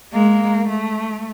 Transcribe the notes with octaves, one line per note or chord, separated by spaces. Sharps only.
G#3 A#3
A3